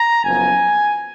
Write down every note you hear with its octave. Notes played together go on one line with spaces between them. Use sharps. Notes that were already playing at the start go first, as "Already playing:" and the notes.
Already playing: A#5
F#1 F#2 F3 B3 G#5